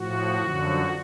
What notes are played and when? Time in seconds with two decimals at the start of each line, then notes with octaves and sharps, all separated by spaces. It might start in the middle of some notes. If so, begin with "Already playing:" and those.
Already playing: A2 F3 F#4
0.37 F#2 D3 F3